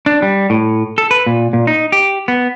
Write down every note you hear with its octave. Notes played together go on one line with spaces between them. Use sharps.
D4
G3
A2
A4
B4
A#2
A#2
D#4
G4
B3